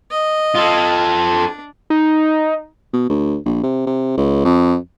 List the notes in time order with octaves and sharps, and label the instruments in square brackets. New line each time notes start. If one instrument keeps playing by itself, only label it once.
[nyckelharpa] D#5
[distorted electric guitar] F4 A4
[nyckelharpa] D4
[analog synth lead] D#4
[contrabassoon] B2
D2
A#1
C3
C3
C#2
F2